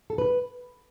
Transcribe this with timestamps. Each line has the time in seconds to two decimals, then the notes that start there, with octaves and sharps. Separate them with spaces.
0.10 A4
0.18 B4